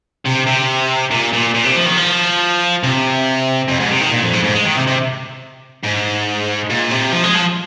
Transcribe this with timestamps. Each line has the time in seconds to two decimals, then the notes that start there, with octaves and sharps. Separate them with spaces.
0.26 C3
0.47 C3
1.11 A#2
1.33 A#2
1.55 A#2
1.65 C3
1.75 F3
1.86 D#3
1.97 F3
2.83 C3
3.68 F2
3.80 G#2
3.91 C3
4.01 D#3
4.11 A#2
4.23 F2
4.33 G#2
4.44 G#2
4.55 G#3
4.66 D#3
4.76 C3
4.87 C3
5.83 G#2
6.70 A#2
6.91 C3
7.12 F3
7.24 G#3
7.34 F3